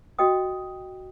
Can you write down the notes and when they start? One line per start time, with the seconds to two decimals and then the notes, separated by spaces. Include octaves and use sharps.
0.19 F#4 D#5 G5 D#6